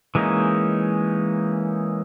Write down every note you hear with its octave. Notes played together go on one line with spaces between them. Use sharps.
E3 G#3 A#3 C#4 D#4